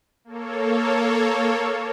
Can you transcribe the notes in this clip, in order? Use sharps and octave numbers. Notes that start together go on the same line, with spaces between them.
A#3 A4 C#5